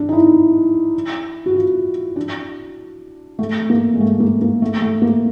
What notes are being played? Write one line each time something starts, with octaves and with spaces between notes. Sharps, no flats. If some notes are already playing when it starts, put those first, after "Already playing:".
Already playing: D4
D#4
E4
F#4
F4
D4
A3
A#3
G#3
A3
A#3
A#3
A3
A3
A#3